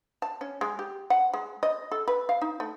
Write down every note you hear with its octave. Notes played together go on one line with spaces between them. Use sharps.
A5
C#4
G#3
G4
F#5
G#3
D#5
A4
B4
F5
D#4
A3